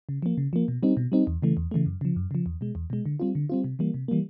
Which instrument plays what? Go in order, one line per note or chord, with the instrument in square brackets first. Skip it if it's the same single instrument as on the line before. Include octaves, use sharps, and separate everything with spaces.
[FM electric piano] C#3
F3 A#3
C#3
F3 A#3
B2
G3 C4 D#4
B2
G3 C4 D#4
E2
C#3 E3 A3
E2
C#3 E3 A3
F#2
C#3 F3
F#2
C#3 F3
E2
B2 G#3
E2
B2 G#3
D3
G3 C4 F4
D3
G3 C4 F4
C3
E3 G3 A#3
C3
E3 G3 A#3